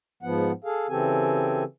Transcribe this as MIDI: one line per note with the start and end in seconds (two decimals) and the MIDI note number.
0.23 0.52 44
0.23 0.52 53
0.23 0.52 59
0.23 0.52 78
0.64 0.87 68
0.64 0.87 69
0.64 0.87 77
0.89 1.64 49
0.89 1.64 52
0.89 1.64 60
0.89 1.64 67
0.89 1.64 69
0.89 1.64 80